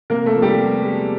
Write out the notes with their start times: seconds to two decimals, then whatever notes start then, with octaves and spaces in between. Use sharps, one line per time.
0.10 C3 A#3 A#4
0.26 A3 A4
0.35 F3
0.42 G3 G4
0.58 B3
0.82 G#3